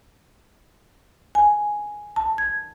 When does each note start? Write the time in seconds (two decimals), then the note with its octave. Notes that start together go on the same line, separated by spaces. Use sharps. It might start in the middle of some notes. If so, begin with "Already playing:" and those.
1.35 G#5
2.16 A5
2.38 G#6